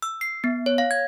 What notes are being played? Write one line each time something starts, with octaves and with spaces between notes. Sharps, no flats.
E6
C7
B3
C#5
F5
G#6